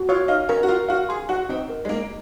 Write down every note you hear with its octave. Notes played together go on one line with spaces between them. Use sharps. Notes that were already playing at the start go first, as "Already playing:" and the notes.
Already playing: F#4
F4 C#5
D#4 F5
C#4 A#4
F#4
F4 A#4
F#4 F5
G#4 C6
F#4 F#5
C4 D#4
A#4
G#3
A#3 D#5